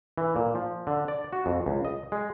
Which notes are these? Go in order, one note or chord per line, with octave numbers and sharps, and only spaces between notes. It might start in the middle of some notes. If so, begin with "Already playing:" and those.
E3
A#2
F3
D3
D5
F#4
F2
C#2
D#5
G#3